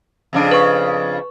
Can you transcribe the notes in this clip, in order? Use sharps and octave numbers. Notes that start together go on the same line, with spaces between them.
F2 C#3 D4
B4 C#6